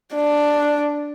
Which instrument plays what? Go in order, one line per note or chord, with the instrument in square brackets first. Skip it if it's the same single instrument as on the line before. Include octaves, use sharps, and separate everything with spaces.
[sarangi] D4